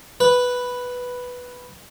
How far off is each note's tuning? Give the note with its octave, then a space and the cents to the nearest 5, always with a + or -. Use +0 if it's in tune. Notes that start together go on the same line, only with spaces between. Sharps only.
B4 +0